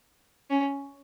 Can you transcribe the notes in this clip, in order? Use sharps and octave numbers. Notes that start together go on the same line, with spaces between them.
C#4